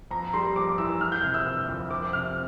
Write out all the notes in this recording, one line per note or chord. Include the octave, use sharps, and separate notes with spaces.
F2 A#5
G3 C6
F2 D6
E3 E6
E3 F6
G6
C3 F6
E6
G1
F2
F3 D6
C3 F6